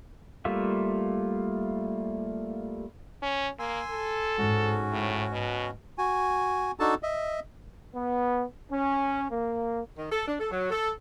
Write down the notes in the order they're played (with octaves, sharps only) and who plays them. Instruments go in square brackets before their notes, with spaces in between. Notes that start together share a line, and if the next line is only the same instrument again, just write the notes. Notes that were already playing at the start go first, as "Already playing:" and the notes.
[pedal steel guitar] G3 A3 A#3 F4 E5
[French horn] C#4
[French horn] A#3 [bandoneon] G#5 C6 E6
[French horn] A4
[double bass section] G#2 [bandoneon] C#4 F#4
[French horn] A2
B2
[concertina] F#4 G#5
D4 D#4 F#4 A4 A5
D#5 E5
[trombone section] B3
C#4
A#3
[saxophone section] D#3
A4
D4
A4
F#3
A4